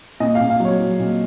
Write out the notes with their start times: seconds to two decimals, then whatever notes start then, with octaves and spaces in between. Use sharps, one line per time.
0.20 A#2 D#5
0.35 F5
0.41 A#2
0.50 F5
0.60 F#3
0.65 C#5
0.80 F#3
0.99 A#2